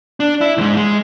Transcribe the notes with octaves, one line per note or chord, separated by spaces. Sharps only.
D4
E4
D2 G#2
G#3